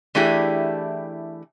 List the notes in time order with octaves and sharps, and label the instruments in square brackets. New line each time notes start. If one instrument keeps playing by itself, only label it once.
[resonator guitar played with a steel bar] E3 A3 D4 E4 G4 G#4